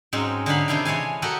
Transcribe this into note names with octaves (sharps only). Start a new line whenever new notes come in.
G#2 F#3 G#3 C4 C#4 D#4
D3 D#4 C#5 F5 B5
C3 D#3 D4 E4 F5 G5
E3 G#3 C#5 F5 G#5
F#4 G4 A4 A#4 D#5 F#5